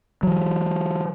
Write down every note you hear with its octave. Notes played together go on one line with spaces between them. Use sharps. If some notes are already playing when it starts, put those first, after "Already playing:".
E3 F#3